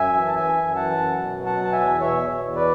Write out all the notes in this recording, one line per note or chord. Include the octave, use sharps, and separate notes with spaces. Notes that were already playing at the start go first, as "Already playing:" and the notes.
Already playing: F#2 E5 G#5
E3
A5
E3 E5 G#5
F#2
E3 F#5 A5
F#2
B2
F#3
F#5 A5
B2 A5
E5 G#5
E2
B2 C#5 E5
B2
E2
B4 D5